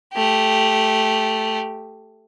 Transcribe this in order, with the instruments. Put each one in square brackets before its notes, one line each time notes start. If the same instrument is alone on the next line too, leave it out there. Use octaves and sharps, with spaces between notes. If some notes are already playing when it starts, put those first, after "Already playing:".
[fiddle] A3 G4